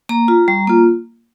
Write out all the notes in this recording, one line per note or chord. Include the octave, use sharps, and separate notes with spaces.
A#3 A#5
F4
G3
A#3 F4